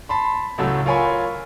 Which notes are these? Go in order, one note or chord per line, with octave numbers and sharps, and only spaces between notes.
A5 B5 C6
C#2 A2 F#3 A3 E6
F4 A#4 C#5 G#5 B5 C#6